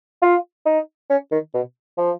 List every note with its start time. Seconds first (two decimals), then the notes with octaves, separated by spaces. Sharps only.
0.22 F4
0.66 D#4
1.10 C#4
1.32 D#3
1.54 B2
1.98 F3